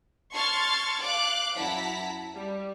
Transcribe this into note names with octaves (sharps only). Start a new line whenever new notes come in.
A5 C6 C#6 F6 G#6 A6
F5 D6 F#6
F#2 E4 F#5 A5 A#5 B6
G3